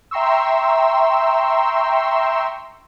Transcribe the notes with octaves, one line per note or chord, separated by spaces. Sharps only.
E5 G5 A#5 C6 C#6 E6